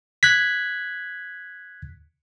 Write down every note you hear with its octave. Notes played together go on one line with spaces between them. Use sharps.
F#6 G#6 B6